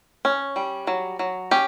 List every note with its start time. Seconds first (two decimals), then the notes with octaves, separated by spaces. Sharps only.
0.25 C#4
0.56 G3
0.87 F#3
1.19 F#3
1.51 C#4 G4